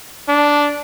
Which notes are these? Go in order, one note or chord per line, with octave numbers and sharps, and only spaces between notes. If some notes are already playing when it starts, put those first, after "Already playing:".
D4